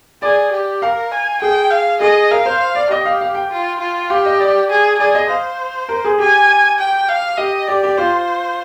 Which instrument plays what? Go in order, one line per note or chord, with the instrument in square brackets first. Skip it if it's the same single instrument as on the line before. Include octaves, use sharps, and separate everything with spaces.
[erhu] G#4 [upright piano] D5
[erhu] G4
[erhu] A#4 [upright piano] F5
[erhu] G#5
[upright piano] G#4 [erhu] G5
[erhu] F5
[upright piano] G#4 [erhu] D#5
[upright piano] A#4 [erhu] F5
[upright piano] C5
D5
[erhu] G4 [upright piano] D#5
[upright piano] F5
F5
G5
[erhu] F4
F4
[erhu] G4 [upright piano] F5
[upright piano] D#5
D5
[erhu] G#4
[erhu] G#4 [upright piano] D5
[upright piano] D#5
[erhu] C5 [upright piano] F5
[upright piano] A#4
G#4
[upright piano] G4 [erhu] G#5
[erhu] G5
F5
[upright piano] G4 [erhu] D#5
[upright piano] G4 [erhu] D5
[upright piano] G4
[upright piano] F4 [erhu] C5